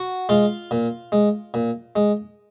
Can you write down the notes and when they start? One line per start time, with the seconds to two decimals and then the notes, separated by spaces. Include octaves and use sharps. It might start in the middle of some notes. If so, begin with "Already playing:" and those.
Already playing: F#4 F#5
0.29 G#3 F4 F5
0.71 A#2
1.12 G#3
1.54 A#2
1.96 G#3